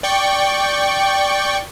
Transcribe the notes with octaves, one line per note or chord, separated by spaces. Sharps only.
D5 G5 C#6